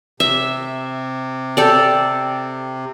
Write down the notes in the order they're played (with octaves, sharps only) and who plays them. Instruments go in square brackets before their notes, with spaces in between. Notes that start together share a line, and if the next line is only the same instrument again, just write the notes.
[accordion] C3 [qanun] E5
[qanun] G4 A4 D5